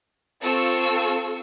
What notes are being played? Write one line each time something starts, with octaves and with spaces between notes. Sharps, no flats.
C4 F4 A4 C#6 E6